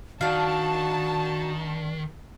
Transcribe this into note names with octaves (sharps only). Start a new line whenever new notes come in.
D#3 D4 F#4 F5 A5